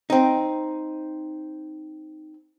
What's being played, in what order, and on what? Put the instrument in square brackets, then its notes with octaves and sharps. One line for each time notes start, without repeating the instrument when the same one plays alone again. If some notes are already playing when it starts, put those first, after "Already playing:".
[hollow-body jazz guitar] C4 D#4